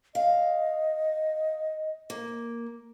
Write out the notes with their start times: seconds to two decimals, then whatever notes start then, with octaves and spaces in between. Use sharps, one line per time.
0.15 D#5 F5
2.10 A#3